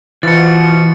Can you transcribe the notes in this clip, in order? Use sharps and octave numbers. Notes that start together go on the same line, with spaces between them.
B2 E3 F3 A6 C#7